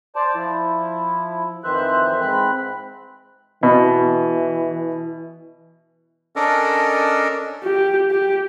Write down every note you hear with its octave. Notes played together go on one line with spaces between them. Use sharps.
C5 D5 A5
F3 E4
F2 D#3 E3 C5 E5 F#6
G#2 C4 B5 F#6
B2 E3
C#4 D4 A4 A#4 D5 D#5
G4
G4